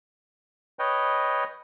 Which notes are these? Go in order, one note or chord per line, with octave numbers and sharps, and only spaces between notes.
B4 C#5 D#5 G5